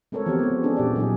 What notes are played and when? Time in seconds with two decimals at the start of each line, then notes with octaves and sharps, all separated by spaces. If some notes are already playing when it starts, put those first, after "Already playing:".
0.12 G#3 C4 A4 A#4 C#5
0.26 E3 F3 B3 C4 G4 C#5
0.39 B3 C4
0.63 C#4 D4 G#4 A4
0.77 A#2 G4 D5
0.95 F#3 D4 D#4 G#4